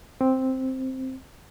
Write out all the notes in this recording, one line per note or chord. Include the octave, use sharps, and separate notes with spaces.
C4